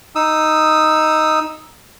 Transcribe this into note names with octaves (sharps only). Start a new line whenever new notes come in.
D#4 D#6 E6